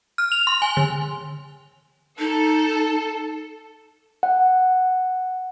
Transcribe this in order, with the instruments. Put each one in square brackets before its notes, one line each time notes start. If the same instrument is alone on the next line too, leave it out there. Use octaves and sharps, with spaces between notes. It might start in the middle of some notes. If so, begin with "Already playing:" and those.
[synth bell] F6
F7
C6
G#5
D3
[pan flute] D#4 [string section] A4
[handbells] F#5